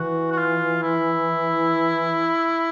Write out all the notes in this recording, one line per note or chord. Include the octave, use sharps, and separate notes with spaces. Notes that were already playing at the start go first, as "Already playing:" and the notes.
Already playing: E3 F#4
F#4
F4
E4